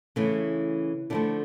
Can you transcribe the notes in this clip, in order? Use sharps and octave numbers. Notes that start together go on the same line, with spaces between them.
C#3 E3 A3 E4
D3 F3 A3 E4